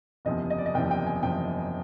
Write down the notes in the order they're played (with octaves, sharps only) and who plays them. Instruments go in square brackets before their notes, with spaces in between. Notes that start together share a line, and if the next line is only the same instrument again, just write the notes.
[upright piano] F#1 E2 C3 F3 D#5
D#5
D5
D#5
F#1 E2 C3 F3 G5
G5
G#5
F#1 E2 C3 F3 G5